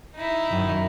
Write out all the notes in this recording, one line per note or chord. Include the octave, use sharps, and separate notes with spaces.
D#4 E4
F#2 D#3